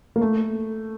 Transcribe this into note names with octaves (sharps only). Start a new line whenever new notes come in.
A#3
A3